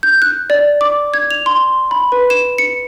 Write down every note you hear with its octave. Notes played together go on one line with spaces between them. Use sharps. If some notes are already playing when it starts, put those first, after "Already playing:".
G6
F#6
D5
D6
G#6
F7
C6
B5
B4
E7
C#7